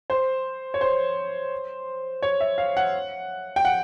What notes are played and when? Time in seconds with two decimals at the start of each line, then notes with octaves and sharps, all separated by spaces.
0.10 C5
0.74 C#5
0.81 C5
2.22 C#5
2.40 E5
2.58 F5
2.77 F#5
3.56 G5
3.65 F#5